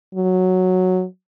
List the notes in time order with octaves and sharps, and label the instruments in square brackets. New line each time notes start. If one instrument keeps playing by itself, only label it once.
[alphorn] F#3